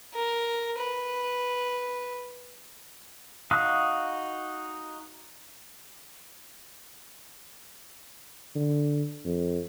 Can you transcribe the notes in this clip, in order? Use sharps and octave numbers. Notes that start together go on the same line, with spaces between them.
A#4
B4
D#4 F#4 F5 D#6 F#6
D3
F2